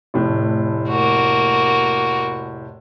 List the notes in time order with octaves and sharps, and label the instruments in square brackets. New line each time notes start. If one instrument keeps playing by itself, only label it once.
[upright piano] F1 A2
[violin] A#3 F#4